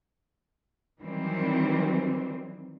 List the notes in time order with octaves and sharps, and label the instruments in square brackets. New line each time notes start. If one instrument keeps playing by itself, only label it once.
[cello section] D#3 E3 F#3 G3 C4